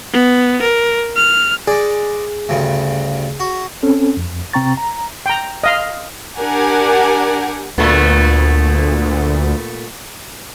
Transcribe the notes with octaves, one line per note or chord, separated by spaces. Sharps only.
B3
A#4
F6
G#3 G#4 D5
D2 G2 C#3
F#4
C4 C#4 A4
F2
C3 C4 G5 A#5 C#6 A6
A#5
G5 A#5
D#5 F5
D4 G4 A#4 F#5 G#5
D2 A#2 A3 B3